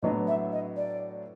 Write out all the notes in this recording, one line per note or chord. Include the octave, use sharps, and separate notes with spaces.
A2 F#3 B3 D4 D#5
E5
D#5
D5